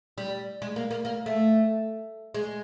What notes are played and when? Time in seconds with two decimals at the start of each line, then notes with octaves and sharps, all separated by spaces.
0.18 G3
0.62 G#3
0.76 A#3
0.91 A#3
1.05 A#3
1.26 A3
2.34 G#3